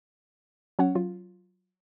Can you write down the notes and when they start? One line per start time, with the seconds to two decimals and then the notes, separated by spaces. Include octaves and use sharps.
0.79 F#3 C#4 C#5 F#5
0.95 F#3 F4